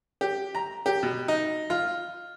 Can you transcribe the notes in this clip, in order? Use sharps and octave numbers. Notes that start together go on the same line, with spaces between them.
G4
A#5
G4
B2
D#4
F4